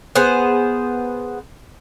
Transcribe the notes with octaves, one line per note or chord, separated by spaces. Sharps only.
B3 G#4 C5